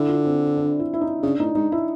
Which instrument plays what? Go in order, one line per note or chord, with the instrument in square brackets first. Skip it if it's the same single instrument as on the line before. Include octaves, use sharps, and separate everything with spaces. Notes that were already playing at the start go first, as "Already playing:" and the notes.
Already playing: [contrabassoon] D3 [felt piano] E4
[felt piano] F4
C4
D4
E4
E4
D#4
[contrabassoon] C#3 [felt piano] D4
[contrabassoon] A2 [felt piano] D#4
[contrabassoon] G#2 [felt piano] D#4
[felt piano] E4